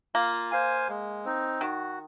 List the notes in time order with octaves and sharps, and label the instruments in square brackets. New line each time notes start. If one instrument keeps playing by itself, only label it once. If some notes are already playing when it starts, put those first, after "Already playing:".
[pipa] A#3 [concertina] F4
[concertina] C5 F5 G#5
G#3
C4 D#4
[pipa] D#3 [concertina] F#4